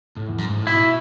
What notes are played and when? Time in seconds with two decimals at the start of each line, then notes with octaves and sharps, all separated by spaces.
0.17 A2
0.28 E2
0.38 F#2
0.47 G#2
0.58 A2
0.67 B2 E4